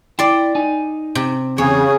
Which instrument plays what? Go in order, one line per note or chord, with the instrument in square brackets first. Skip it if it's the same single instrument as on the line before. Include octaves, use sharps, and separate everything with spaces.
[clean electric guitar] E4 G5 [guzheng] D5 C6
[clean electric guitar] D#4 G#5
[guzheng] C3
[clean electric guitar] E2 C4 [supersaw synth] C#3 [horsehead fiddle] G#4 [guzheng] C#5